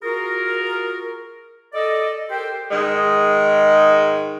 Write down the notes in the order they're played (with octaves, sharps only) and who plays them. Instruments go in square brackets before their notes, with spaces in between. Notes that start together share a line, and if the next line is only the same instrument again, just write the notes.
[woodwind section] F4 F#4 G#4 A#4
A4 D5 D#5
G4 A4 A#4 C5 G5
[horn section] G#2 D#3 G#3